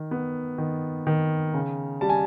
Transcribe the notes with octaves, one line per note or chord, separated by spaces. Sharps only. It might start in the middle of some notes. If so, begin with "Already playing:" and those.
Already playing: D#3
B3
D#3
D#3
C#3
G3 A5
G#5